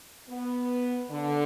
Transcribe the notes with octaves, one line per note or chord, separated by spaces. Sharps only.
B3
D3